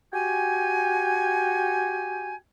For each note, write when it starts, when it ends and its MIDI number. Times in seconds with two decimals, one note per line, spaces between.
0.13 2.35 66
0.13 2.35 67
0.13 2.35 79
0.13 2.35 80